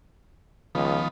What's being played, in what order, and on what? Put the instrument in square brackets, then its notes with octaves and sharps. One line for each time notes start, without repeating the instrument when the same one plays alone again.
[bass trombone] C#2 [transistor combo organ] D#3 F3 B3